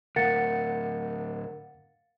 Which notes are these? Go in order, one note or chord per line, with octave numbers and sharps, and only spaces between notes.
D2 A2 A#4 F5 F#5 A6 C#7